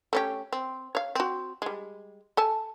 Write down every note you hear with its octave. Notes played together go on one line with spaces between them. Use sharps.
A3 C#4 G4
C4
C#5 F5
C4 F#4
G3 G#3
A4 G#5 A5